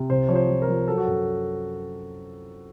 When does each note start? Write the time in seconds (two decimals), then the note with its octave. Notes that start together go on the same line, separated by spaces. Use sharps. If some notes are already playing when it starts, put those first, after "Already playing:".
Already playing: C3
0.10 C2 C5
0.29 F3 C#5
0.35 C5
0.49 F3
0.62 A#4
0.68 F3
0.88 F#3 A4
0.98 F#4
1.07 F#2 A4